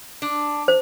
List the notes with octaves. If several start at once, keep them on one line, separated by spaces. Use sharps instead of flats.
D4
C5